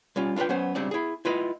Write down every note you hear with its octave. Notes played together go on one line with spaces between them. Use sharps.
G3 C#4 F4
D4 F4 A#4 B4 G5
F#3 B3 C#4 C5
C#2 C#3 G3 C4 D4 D5
E4 G#4
E4 F4 B4 D#5